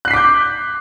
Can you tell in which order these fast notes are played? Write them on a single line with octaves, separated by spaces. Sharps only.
F#6 C7 B6 D6 G6